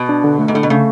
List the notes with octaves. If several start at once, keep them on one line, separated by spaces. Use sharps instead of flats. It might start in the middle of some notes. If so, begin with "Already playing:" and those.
Already playing: B2
D4
D3
A3
G#2
A2 D3
B2
C#3 A3